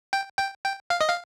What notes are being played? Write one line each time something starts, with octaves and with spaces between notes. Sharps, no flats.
G5
G5
G5
F5
D#5
F5